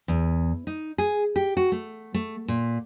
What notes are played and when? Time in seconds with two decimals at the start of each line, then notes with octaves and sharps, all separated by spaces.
0.08 E2
0.67 D#4
0.98 G#4
1.36 G4
1.57 F#4
1.72 A3
2.14 A3
2.48 A#2